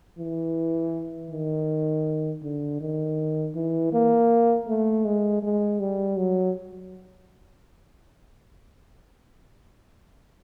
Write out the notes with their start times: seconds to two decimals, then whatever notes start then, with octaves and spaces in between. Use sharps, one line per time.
0.18 E3
1.30 D#3
2.43 D3
2.80 D#3
3.55 E3
3.93 A#3
4.68 A3
5.05 G#3
5.43 G#3
5.80 G3
6.17 F#3